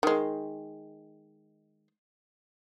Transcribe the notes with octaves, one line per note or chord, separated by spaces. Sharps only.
D#3 G#3